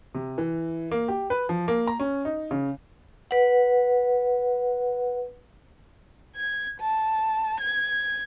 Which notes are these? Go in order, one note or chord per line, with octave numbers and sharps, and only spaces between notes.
C3
E3
A#3
G4
B4
F3
A#3
A#5
C#4
D#4
C#3
B4 F#5
G#6
A5
G#6